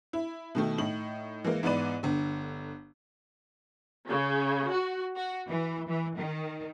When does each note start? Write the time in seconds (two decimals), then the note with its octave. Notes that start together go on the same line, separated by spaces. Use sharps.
0.13 E4
0.55 B2 D#3 A3
0.78 A2 D#4 F#7
1.44 E3 G#3 A#3
1.63 G#2 E3 B3 B4 D5 D#7
2.03 G1 D3
4.07 C#3
4.69 F#4
5.16 F#4
5.49 E3
5.88 E3
6.17 D#3